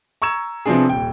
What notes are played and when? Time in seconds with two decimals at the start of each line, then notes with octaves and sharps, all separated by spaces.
0.22 A#5 C#6 E6 G#6 E7
0.66 C3 F3 B3 C4 D4 G#4
0.89 D#1 G5